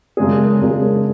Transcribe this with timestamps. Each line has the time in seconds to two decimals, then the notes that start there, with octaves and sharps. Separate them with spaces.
0.17 F#2 C#3 G#3 D4 G#4
0.59 F#2 C#3 G#3 D4 G#4